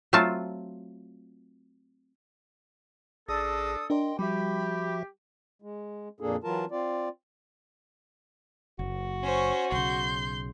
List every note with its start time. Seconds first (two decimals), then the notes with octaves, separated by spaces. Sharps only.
0.13 F#3 A3 C4 F4 A5
3.29 A1 D4 G#4 A4 D#6 A#6
3.90 D4 A#4 D5 D#5 G5 C6
4.19 F3 G3 F#4 G4 E5 B5
5.62 G#3
6.20 F2 A#2 A#3 D4 G#4 A4
6.44 E3 F#3 F4 A#4 A5
6.71 C4 F4 D5
8.79 F#1 F#4
9.23 C#4 C5
9.72 B1 C#3 C6 G6